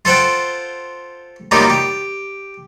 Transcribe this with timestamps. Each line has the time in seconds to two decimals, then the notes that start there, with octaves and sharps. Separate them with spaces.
0.05 F4 A4 C5 F#5 G5
1.51 F#3 G3 A#3 D#4 F4 G4
1.70 G4